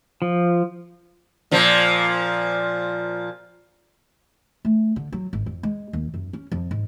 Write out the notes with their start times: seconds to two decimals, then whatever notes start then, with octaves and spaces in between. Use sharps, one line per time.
0.22 F3
1.51 A#2 F3
4.65 A3
4.96 D3
5.13 F#3
5.33 G#1
5.46 F2
5.63 G#3
5.93 D#2
6.14 F#2
6.33 C#4
6.52 F2
6.71 G#2